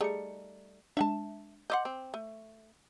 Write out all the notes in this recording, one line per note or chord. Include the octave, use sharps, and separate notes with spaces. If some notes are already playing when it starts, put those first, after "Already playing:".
G3 A3 D#4 G#4 C#7
G#3 D4 E5 F#5 A5
D#5 E5 F#5 C6 D6 G6
C4
A3